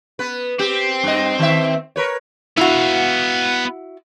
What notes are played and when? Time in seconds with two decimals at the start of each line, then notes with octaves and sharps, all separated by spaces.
0.19 B3 B4
0.59 C4 G4
1.04 G2 D#5
1.39 D#3 E5
1.96 A#4 B4 C#5
2.57 B3 E4 F#4 F5